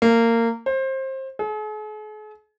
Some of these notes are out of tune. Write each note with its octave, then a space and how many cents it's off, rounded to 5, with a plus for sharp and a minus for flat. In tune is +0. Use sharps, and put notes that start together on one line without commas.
A#3 -20
C5 +25
G#4 +45